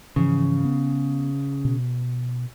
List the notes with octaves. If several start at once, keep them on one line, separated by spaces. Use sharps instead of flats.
G#2 C#3 E3 F3
B3
B2